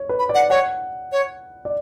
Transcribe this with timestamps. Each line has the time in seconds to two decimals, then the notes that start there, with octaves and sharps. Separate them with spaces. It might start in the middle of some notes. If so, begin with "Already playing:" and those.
Already playing: C#5
0.09 B4
0.19 B5
0.29 D5
0.35 F#5
0.50 C#5 F#5
1.12 C#5
1.65 D5